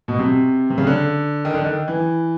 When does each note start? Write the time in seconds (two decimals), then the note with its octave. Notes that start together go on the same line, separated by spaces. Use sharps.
0.08 B2
0.19 C3
0.70 C3
0.78 C#3
0.87 D3
1.45 D#3
1.54 D3
1.65 D#3
1.88 E3